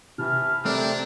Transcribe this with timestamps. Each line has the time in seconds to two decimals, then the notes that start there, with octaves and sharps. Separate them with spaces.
0.18 C3 E3 A5 F6
0.65 A3 C4 D4 A#4 D5